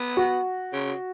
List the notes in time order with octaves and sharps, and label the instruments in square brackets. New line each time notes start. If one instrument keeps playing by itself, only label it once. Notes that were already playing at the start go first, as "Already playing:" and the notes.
Already playing: [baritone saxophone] B3
[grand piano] F#4
[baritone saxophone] C#3